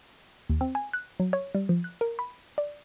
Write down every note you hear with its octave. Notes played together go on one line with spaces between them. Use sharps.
D#2
C4
G#5
F#6
F#3
C#5
G3
F3
F#6
A#4
B5
D5